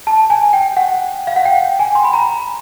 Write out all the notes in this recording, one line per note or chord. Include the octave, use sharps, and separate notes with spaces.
A5
G#5
G5
F#5
F5
F#5
G5
G#5
C6
B5
A#5